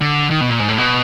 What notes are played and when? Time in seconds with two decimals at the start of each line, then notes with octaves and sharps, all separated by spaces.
0.01 D3
0.30 D#3
0.41 B2
0.50 A#2
0.60 G#2
0.69 A2
0.78 B2